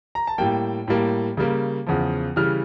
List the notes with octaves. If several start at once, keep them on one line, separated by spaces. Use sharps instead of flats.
A#5
A5
A2 G3 A#3 G5
A2 G3 A#3
C#3 G3 A#3
E2 C#3 F3
C#3 E3 G3 F6